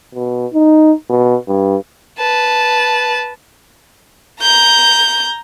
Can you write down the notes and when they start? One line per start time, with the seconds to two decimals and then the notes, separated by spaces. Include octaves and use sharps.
0.14 B2
0.53 D#4
1.10 B2
1.48 G2
2.19 B4 A5
4.40 A#5 G6